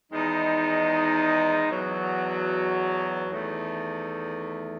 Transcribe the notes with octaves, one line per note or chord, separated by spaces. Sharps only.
E2 D#3 G#3 D#4
E2 B2 F#3
E2 D#3 A3